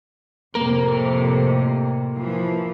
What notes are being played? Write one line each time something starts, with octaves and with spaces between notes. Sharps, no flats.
F2 A2 C3 A#3 A#4
E3 F3